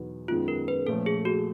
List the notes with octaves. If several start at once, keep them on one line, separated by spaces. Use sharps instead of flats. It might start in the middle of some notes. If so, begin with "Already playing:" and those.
Already playing: E2 B2 F#3 B3 D#4
F#2 D#3 G#3 B3 F4
A#4
B4
A#2 F3 A3 C#4 A4
G#4
F#4